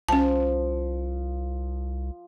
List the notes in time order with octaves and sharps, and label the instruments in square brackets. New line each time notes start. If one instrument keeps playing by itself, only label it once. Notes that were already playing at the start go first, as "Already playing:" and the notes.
[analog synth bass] C2 [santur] F3 [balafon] C#4 A5